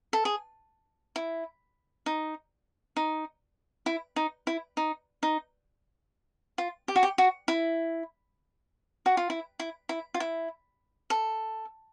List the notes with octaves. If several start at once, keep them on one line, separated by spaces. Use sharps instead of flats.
A4
G#4
E4
D#4
D#4
E4
D#4
E4
D#4
D#4
F4
G4
F#4
G4
F#4
E4
F#4
F4
E4
E4
E4
F4
E4
A4